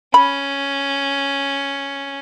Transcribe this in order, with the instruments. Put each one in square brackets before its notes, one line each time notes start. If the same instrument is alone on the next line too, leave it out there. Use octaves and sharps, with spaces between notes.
[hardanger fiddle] C#4 [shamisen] B5